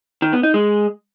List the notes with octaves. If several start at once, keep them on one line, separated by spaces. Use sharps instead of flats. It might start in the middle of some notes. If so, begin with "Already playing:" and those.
D#3
B3
D#4
G#3